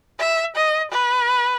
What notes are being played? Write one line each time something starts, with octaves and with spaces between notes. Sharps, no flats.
E5
D#5
B4